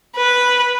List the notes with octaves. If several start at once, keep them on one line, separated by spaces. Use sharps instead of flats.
B4